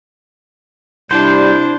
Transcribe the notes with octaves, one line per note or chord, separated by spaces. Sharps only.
C3 G3 D4 E4 C5